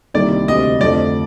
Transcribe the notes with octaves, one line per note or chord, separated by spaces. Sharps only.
C2 C3 D#3 G3 A#3 D5
D2 C3 G3 C4 D#5
F2 D3 A3 C4 D5